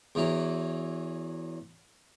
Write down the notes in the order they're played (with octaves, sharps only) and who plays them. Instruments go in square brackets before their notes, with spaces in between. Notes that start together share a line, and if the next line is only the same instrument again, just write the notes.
[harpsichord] E2 E3 F#3